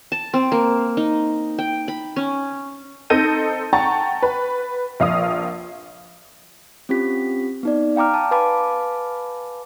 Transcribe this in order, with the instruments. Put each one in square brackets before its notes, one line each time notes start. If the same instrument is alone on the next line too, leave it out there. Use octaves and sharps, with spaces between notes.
[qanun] A5
C4
A#3
D#4
G5
B5
C#4
[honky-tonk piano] C4 D#4 A4 G6 A#6 D#7
F#5 G5 A5 A#5 C#6 A6
B4
A#1 F5 D#6
[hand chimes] C4 C#4 F4 G4 B6
B3 D#4 D5
F5 G5 A#5 D6 F6
A5
B4 F5 G#5 A5 B5 D6